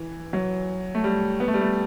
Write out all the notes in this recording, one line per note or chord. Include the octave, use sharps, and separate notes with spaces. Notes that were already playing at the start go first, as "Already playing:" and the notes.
Already playing: E3
F#3
A3
G3
B3
A3
G3
A3